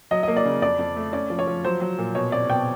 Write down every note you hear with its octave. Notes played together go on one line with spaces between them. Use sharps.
F#3 D#5
A#3 D#5
D5
C#3
F2 D5
F2
A3
C#4 D5
F3
C#5
F3
F#3 C5
F#3
A#2
B2 C#5
C4 D5
B2 G5